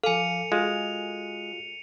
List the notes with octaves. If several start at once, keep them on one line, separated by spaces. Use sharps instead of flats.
F3 A4 F5 G#5 C#7 D#7 F7
G#3 F4 F#4